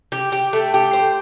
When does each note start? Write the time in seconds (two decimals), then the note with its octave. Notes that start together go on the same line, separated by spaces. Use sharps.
0.12 G4
0.32 G4
0.53 A3
0.74 G4
0.93 C5